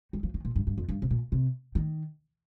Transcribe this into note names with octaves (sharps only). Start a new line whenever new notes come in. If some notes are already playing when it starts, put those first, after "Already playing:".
G3
F3
D#3
A#2
G2
G2
F2
G2
C3
A#2
C3
D#3